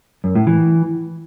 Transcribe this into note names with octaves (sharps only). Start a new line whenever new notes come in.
F#2
A2
E3